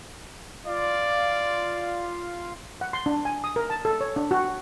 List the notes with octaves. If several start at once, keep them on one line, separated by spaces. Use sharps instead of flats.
F4 D5 F5
F#5
C6
D4
G#5
D#6
A#4
A5
A4
C#5
D4
F#4